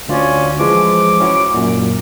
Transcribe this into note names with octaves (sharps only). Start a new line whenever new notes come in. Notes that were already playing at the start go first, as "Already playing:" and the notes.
D2 C#4 F4 D5
E3 F3 G#3 D6
C#4 E4 F#4
F#2 A#2